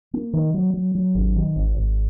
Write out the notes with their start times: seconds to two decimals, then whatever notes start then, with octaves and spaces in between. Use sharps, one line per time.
0.13 A#3
0.33 D#3
0.54 F#3
0.74 F#3
0.95 F#3
1.15 G#1
1.36 D#3
1.56 G#1
1.77 G#1